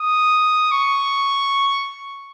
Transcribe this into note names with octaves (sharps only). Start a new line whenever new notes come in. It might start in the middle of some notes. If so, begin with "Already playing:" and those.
Already playing: D#6
C#6